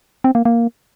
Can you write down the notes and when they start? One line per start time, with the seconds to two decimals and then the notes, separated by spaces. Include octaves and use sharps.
0.24 C4
0.35 A#3
0.45 A#3